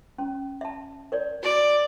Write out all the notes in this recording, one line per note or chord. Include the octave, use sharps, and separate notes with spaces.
C#4
E5 A5
A#4 C#5 D5
F#4 D5